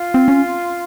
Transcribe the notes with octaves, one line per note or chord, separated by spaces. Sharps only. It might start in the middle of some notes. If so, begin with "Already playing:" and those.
Already playing: F4
C4
C#4